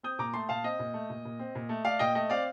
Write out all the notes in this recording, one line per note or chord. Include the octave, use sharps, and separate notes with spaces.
C4 D#6 G6
A#2 A#5 D6
A3 A5 C6
A#2 F5 A5
C4 D#5
A#2
A3
A#2
A#2
C4
A#2
A3
A3 D5 F5
A#2 D#5 G5
A3 D#5
C4 D5 F5